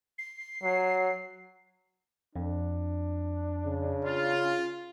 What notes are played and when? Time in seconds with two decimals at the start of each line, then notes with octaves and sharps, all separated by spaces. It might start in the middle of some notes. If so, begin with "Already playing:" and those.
0.18 C7
0.63 F#3
2.36 F2 D4
3.65 C#3
4.05 F4